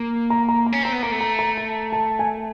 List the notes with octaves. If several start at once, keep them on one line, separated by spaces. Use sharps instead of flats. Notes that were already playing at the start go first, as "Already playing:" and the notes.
Already playing: A#3
A#5
A#5
A#5
C#4
C4 A#5
B3
A#3 A#5
A3
A#5
A#5
A#5
A5
G#5